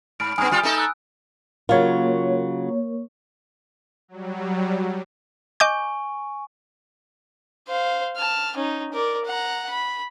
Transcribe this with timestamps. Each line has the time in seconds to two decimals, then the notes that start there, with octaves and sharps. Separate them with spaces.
0.20 G#2 B5 F6 D7
0.38 G2 B3 G#5 D#6 F6
0.51 G3 F4 G4
0.63 A3 D#4 A4
0.78 E6 F#6
1.69 C#3 F#3 A#3 F4 C#5
4.08 F#3 G3
5.60 D#5 G#5 C#6 D6 G6
7.67 C5 F5
8.16 A5 F6
8.56 C#4 D#4
8.92 A#4 D5
9.25 F#5 A#5
9.69 B5